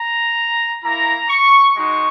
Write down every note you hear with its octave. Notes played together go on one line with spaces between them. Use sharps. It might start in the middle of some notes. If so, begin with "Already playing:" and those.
Already playing: A#5
A#3 E4 A#5
C#6
G#3 D#4 F#4 C#6